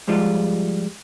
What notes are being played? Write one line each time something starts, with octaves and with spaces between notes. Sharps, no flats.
G#2 F3 G3 G#3 F4